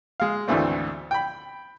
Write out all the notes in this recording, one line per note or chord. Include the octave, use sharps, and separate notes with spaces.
G#3 F5
G#1 D2 D3 E3 A3 C4
G5 B5